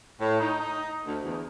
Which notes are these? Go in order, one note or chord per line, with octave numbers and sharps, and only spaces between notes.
A2
D#4
D#4
D2
E2